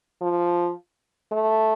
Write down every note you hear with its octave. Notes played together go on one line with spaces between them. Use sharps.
F3
A3